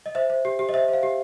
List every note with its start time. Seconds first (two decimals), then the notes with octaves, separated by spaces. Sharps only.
0.06 D#5
0.15 C5 E5
0.30 C5
0.45 G4
0.59 G4
0.69 D#5
0.73 C5 E5
0.88 C5
0.93 F5
1.03 G4